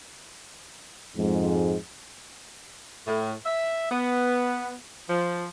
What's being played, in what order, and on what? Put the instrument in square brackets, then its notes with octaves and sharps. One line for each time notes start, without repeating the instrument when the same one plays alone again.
[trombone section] F2 G#2 G#3
[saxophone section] A2
E5
B3
F3